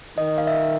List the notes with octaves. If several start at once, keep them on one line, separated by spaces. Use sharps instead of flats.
D#3 D#5
F5
E5